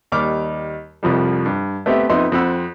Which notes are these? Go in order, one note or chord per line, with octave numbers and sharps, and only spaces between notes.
D#2 G3 D6 F6
C2 F2 F3 G3
G2
A3 B3 C4 G4 B4 E5
F2 B3 D#4 E5 C6 D#6
F2 C4 F#5 B5 E6